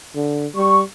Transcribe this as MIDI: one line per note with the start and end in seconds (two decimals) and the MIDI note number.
0.16 0.47 50
0.56 0.83 55
0.56 0.82 85